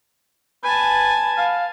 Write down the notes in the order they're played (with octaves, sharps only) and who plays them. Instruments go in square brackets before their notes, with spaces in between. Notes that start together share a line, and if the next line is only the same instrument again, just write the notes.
[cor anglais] B4 [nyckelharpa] G#5 A5
[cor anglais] F5